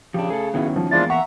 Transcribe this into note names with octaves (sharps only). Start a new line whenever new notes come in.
C#3 F3 D4 G4
A3 G#4 A4
D#3 F#3 B3 C#4 E4
F3
E2 F3 G#3 A#3 D4 E4 F4 A6
E5 F#5 A#5 C#6